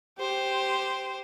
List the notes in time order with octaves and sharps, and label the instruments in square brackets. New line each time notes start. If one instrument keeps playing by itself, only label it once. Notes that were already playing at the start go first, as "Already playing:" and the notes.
[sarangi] G4 [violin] C5